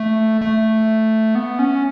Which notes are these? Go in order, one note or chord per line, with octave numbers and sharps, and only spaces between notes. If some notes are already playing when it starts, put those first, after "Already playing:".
Already playing: A3
A3
B3
C#4